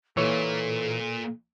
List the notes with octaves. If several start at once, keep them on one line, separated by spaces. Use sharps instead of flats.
A#2 E3 A4 C#5